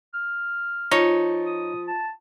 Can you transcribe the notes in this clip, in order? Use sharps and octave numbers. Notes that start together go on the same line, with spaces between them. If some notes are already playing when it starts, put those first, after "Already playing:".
F6
F3 D#4 C#5
D#6
A5